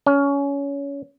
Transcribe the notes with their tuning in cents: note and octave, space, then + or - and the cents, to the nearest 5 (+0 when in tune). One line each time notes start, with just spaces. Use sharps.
C#4 +20